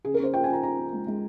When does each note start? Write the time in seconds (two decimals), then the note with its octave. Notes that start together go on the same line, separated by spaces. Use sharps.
0.05 C#3 G#4
0.14 A#4
0.19 C#4 C5
0.33 F4 G5
0.44 G#5
0.49 F4 A#5
0.62 F4 A#5
0.78 C#4
0.93 G#3
1.07 G#3